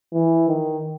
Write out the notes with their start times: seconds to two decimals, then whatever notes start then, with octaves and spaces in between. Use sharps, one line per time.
0.13 E3
0.48 D#3